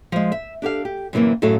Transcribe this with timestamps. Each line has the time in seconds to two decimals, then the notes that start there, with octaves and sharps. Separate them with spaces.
0.12 F3 G#3
0.32 E5
0.62 D4 G4 A4 F5
0.85 G4
1.13 F#2 C3 E3 G#3 A#3
1.42 F#2 A2 F#4 A4 F5